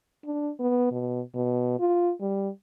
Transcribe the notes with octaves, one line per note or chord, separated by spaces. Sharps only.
D4
B3
B2
B2
F4
G3